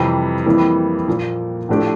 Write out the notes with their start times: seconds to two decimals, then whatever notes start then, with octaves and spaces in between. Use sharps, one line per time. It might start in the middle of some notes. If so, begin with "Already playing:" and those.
Already playing: F2 C3 E3 G3
0.46 F2 E3 G3 A#3 E4
1.08 A#2 F3 A#3
1.69 A2 F3 A3 D4 G4